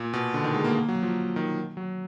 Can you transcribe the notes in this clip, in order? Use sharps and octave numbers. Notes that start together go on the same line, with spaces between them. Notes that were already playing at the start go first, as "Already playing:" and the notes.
Already playing: A#2
B2
D3
D#3
G#3
A#3
A#3
F#3
F3
D#3
F#3